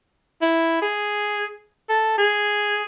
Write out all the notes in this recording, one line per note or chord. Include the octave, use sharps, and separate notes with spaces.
E4
G#4
A4
G#4